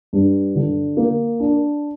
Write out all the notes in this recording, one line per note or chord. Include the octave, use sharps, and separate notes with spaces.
G2
D3
A#3
D4